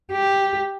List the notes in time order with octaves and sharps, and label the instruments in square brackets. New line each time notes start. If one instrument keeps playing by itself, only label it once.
[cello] G4